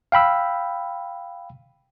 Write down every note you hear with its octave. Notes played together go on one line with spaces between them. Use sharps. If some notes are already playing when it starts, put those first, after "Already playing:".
F5 G5 B5 E6